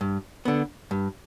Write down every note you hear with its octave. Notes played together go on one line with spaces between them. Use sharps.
G2
D3 B3
G2